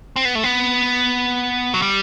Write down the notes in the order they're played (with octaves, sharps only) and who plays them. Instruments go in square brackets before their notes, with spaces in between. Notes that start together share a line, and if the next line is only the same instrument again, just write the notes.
[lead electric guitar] C4
B3
A3
B3
F#3
G3